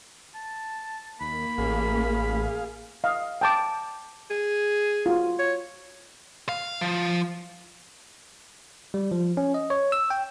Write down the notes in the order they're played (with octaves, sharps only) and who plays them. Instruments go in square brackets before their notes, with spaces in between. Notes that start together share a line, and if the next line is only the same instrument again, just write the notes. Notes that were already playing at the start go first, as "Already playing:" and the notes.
[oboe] A5
[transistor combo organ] D#2 [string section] A#3 [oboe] B5
[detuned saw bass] A1 [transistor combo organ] G#4 F5
[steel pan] D#5 F5
G5 A5 D6
[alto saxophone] G#4
[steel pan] F4 F#4
[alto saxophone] C#5
[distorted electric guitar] F5
F3
[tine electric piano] G3
F3
C#4
D#5
C#5
E6
G5